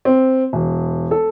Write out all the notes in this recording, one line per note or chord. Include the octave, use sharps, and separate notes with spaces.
C4
E1
A4